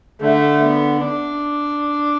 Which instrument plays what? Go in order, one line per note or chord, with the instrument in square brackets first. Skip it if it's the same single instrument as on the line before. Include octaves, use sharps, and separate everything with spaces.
[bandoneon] D3 [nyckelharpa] A3
[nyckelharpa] B3
D4